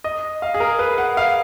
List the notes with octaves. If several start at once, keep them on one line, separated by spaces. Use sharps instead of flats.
D#5
F5
G#4
A#4
B4
F#5
F5